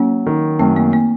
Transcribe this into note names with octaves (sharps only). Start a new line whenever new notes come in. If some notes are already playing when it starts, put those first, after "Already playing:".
Already playing: F#3 A#3 C#4
D#3
F#2 A3 C4
A#3
A#3